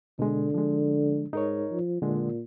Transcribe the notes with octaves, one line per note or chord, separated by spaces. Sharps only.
B2 D3 G#3
F3 G#3
G#2 D#4 A#4 C#5
F3
A#2 D3 G#3